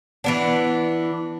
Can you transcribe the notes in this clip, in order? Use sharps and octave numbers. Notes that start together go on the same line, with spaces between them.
E3 B3 D4